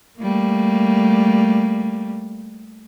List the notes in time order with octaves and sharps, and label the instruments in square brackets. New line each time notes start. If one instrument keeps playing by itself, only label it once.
[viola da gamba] G3 A3 A#3